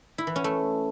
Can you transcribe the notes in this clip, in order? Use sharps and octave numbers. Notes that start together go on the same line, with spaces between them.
E4
E3
C#4
A3